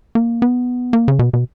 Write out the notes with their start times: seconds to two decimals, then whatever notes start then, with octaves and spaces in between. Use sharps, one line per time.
0.15 A#3
0.42 B3
0.93 A#3
1.08 C#3
1.19 B2
1.33 B2